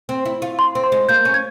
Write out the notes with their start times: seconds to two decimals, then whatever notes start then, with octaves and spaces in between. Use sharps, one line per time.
0.09 C4
0.26 E4
0.42 F4
0.59 C6
0.75 C4
0.84 C6
0.92 G#3
1.09 A#3 G6
1.25 C#4
1.34 G#6